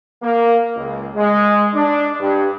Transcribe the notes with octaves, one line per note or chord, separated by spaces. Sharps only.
A#3
C#2
G#3
D4
G2